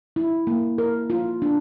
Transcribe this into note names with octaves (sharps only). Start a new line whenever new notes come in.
E4
A#3
A#4
F4
D4